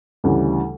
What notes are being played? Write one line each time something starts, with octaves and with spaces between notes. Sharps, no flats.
D2 C#3 E3 G3